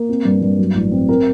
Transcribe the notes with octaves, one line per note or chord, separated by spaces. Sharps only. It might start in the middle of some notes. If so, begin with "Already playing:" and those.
Already playing: A#3
C4
G2
G2
F#3
A1
C4
C4 A#4